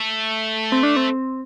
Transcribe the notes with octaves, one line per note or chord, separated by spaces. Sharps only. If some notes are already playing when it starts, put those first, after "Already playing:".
Already playing: A3
C4
D4
C4